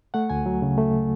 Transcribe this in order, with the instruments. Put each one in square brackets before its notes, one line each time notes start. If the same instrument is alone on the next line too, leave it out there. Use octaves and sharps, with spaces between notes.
[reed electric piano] A3 F#5
D2 G#5
F#3
C#3
A3